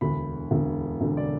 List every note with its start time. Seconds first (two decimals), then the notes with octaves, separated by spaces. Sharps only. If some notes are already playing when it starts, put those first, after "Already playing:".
0.01 E1 D2 D3 B5
0.51 E1 D2 D3
1.01 E1 D2 D3
1.17 D5